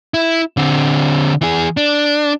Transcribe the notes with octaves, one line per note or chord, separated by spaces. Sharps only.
E4
D3 C4
E3 G#4
D4